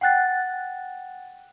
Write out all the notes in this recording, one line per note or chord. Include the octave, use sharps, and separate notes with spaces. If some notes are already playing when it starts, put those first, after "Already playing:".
F#5 G5 F#6 A6